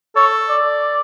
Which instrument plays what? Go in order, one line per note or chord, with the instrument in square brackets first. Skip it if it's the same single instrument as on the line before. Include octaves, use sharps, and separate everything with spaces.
[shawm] A4 [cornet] C#5
[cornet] D5